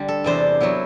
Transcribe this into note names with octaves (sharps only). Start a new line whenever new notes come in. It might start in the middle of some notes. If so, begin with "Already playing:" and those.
Already playing: D3 G3
A4
E2 C3 G3 D4 C5
F#3 B3 E4